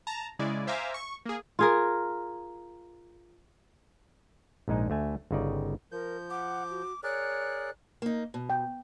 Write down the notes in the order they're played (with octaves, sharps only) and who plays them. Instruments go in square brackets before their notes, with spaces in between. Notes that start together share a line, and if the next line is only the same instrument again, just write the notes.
[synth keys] A5 A#5 A#6
C#3 G#3 E4 D5 G#5
C5 E5 F5 G#5 A#5 D6
C#6
A#3 G#4
[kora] F4 G#4 A#4
[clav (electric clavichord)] A#1 G#2 G#3 D#4
D2 A3 G#5
G1 C#3 D#4 D5
[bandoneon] F3 G6 [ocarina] A#4
[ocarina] F#5 [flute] D6
[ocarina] F#4
[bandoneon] G#4 A#4 D5 [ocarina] C#5 [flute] F#6
[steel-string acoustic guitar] A#3 D#4
B2
[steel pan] G5